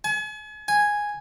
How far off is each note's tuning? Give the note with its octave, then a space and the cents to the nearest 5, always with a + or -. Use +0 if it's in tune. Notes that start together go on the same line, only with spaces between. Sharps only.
G#5 +40
G#5 -5